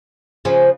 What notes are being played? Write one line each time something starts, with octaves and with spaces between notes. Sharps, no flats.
C#3 F3